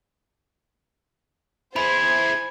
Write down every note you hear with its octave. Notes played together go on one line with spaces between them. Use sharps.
E4 G#4 C5 B5 G#6